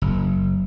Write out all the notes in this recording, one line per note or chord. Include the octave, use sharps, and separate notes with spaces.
F#1